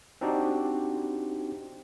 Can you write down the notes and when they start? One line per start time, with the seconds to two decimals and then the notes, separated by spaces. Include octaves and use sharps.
0.21 C4 D4 D#4 F#4 G4